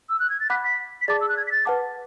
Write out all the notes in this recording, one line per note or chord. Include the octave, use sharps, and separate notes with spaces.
E6
F#6
G#6
A6
F#5 B5 D6 F#6 B6
B6
B6
G#4 D5 A5 D6 A6
E6
F#6
G#6
B6
A6
B4 F#5 A5 D6